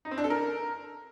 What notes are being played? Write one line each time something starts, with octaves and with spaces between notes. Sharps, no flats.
D#4
C4
D4
A4
A#4